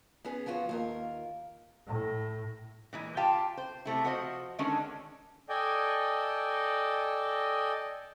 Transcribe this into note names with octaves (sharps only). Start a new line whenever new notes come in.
B3 C#4 G#4
F3 B3 F4 F#4 C#5
D#2 F4 A#4
A2
A#2 E3 G#3
F4 G4 F5 G5 A5
C5
C3 A3 E4
F3 F#4 C5 D#5
D3 D#3 G#3 C#4 D4
A4 D5 D#5 G5 G#5